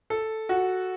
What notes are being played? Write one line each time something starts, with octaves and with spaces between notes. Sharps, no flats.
A4
F#4